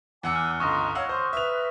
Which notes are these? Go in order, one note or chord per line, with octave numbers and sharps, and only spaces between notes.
E2 F#5 G#5 D6 E6 C#7
F6 F#6
G1 C#2 D#5 A#5 C6 C#6 D#6 A#6
C#5 F5 F#5 E6
C5 C6 G6
B4 E5 F7